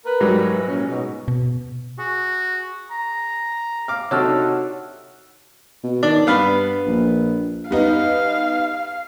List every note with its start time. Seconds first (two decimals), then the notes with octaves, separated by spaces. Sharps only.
0.06 A#4 B4
0.21 G#2 F#3 G3
0.52 E3
0.67 A#2 C#4
0.89 G#2 B2
1.28 B2
1.98 F#4 G#4
2.91 A#5
3.88 F5 D6 F6
4.11 C3 D4 D#4 F#4 A4 C#5 E6 F6
5.83 B2
6.03 D#3 D4
6.27 G2 B3 F5 B5
6.86 A#1
7.71 G3 B3 D#4 F5